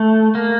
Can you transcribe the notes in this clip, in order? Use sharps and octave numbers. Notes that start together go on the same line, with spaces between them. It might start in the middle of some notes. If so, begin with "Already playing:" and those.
Already playing: A3
A#3